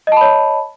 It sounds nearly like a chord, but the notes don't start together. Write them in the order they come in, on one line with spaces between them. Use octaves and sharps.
D#5 A5 B5 C#5